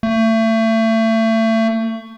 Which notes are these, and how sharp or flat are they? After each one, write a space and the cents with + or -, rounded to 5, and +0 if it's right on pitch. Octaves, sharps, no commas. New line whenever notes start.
A3 +30